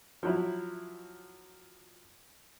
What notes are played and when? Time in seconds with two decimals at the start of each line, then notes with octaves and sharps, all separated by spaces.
0.23 F3 F#3 E4